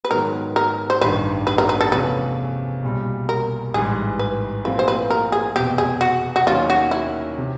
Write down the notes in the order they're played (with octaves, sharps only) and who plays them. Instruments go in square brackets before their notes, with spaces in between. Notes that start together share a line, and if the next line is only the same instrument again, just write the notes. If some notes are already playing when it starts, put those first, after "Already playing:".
[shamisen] B4
[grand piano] G#2 D#3 F#3 B3 [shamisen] A#4
[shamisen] A#4
C5
[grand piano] A1 G2 D#3 [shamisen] B4
[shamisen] B4
A#4
B4
A4
[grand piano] E2 C3 F3 A3 C#4 [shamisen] B4
[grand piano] B1 A#2 G3
[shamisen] A#4
[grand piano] A1 G#2 E3 G3 [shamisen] G#4
[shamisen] B4
[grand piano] A#2 F3 A3 C4 E4 [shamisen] B4
[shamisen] C5
B4
A#4
G#4
[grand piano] F1 E2 B2 [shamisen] G4
[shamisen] G#4
F#4
F#4
[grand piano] D#2 D#3 F#3 A#3 C#4 [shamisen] F4
[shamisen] F#4
E4
[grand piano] C3